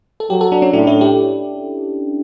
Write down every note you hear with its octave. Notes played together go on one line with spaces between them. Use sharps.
A4
F#3 G4
A4
D4
C#4
A2 D4
E4
G4